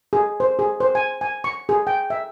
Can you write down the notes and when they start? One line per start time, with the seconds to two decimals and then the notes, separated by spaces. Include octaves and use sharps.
0.13 G#4
0.40 C5
0.59 G#4
0.80 C5
0.95 G#5
1.21 G#5
1.44 C#6
1.69 G#4
1.87 G5
2.10 E5